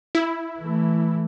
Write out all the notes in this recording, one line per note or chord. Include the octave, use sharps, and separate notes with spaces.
E4
E3 A3